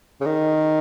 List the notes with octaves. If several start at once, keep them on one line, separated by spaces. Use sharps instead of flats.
C#3
D#3